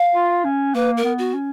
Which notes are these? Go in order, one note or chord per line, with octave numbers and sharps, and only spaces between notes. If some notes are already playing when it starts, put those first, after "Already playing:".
Already playing: F5
F4
C#4
A#3 B4
A#4
B3
F#4
C#4